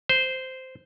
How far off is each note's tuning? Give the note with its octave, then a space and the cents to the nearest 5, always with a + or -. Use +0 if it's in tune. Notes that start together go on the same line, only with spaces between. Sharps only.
C5 -10